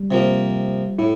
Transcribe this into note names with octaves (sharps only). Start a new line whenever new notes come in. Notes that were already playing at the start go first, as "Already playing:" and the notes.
Already playing: G3
C3 F3 A#3
A2 E4